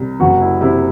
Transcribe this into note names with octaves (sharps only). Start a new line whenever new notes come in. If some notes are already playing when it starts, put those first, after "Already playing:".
Already playing: C2
F#1 F#4
E4
C3 E4